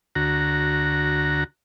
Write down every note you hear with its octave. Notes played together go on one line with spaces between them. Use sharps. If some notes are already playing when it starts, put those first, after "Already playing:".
D2 F#4 A#5